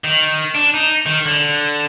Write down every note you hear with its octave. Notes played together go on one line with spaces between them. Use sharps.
D#3
D4
D#4
D#3
D3